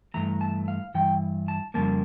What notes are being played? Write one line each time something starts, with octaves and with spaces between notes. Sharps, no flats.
G2 E3 A3 A#5
A5
F5
G2 E3 G5
A5
F2 C#3 G3 A#3 A5